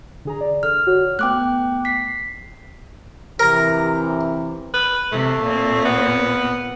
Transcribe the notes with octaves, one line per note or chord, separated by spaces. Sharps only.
D3 G#4 A#5
D5
D3 F6
F#4 C#5
A3 B3 G5 D6 F#6
B6 C7
C3 E3 A#4 A#5
B4
C3 A3
A#2 C4
B3